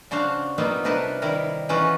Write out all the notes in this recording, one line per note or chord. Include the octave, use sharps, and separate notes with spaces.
C#3 D4 F#4 C5 F5
F#3 G3 A#3 B3 D#4 F4
C3 D4 D#4 A#4 B4 A5
D#3 G3 E4 A#4
E3 C#4 D#4 F4 F#4